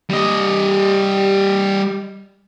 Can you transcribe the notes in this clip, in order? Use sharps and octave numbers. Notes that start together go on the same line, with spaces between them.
G3 D#5